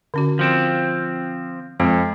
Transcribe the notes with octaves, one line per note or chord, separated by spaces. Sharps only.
D3 C#4 F#4
F3 C4
F2 G#3 C4 F4